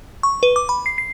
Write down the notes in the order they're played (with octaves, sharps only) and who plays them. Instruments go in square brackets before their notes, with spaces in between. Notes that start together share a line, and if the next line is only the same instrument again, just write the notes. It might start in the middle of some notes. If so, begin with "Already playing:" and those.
[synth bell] C#6
B4
D6
B5
C7
C7